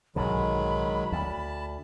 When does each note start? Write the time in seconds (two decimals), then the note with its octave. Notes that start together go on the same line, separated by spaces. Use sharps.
0.16 B1 G#2 D3 D#3 F#3 G#3 B5
1.12 D2 A5